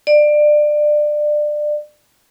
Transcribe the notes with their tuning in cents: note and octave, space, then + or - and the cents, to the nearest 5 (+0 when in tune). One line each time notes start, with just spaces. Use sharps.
D5 +25